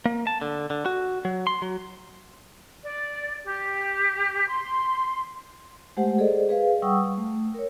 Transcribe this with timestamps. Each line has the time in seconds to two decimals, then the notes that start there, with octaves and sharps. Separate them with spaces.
0.06 A#3
0.27 A5
0.41 D3
0.70 D3
0.86 F#4
1.25 F#3
1.47 C6
1.62 F#3
2.84 D5
3.44 G4
4.48 C6
5.97 G#3 A3 G4 C5 F#5
6.18 G#4 A4 C5 D5 D#5
6.49 G#4 B4 F5
6.82 G3 F#5 G5 C#6 D#6 E6
7.17 A3
7.54 A#4 C#5